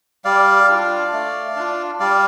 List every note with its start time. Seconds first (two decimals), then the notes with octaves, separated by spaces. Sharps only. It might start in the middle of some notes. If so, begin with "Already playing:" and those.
0.25 G3 D5 F5
0.69 D4 F4
1.13 A3
1.56 D4 F4
2.00 G3 D5 F5